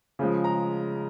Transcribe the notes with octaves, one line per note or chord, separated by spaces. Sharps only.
C#3 F3 G#3
A#5